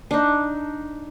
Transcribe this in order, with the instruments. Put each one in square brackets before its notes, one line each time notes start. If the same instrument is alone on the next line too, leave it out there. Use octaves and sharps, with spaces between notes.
[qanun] D4 D#4